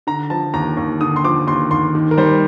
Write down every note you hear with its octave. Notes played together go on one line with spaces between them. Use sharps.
D3 A#5
F3 A5
D#2 A#5
D#2
D3 D#6
C6
F3 D6
D#2 C6
D#2 C6
D#3
A#4
G3 C5